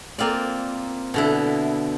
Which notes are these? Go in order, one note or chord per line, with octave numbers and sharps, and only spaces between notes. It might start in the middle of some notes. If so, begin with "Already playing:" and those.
A#3 C4 F4 D5
B2 D3 E4